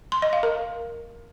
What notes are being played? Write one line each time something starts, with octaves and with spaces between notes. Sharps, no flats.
C6
D#5
F5
A#4